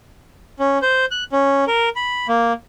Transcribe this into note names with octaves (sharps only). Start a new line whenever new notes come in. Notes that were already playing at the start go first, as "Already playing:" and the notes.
C#4
C5
F#6
C#4
A#4
B5
A#3